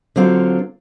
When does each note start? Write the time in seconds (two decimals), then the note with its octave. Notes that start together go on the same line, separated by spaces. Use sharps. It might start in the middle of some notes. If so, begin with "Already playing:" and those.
0.16 D3 F#3 C4 F4